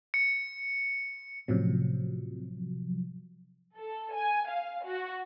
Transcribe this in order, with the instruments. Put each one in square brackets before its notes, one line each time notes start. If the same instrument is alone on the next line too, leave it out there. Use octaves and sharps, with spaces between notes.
[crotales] C#7
[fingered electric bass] A2 C#4 [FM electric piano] C3 F3 F#3
[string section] A4
G#5
F5
F#4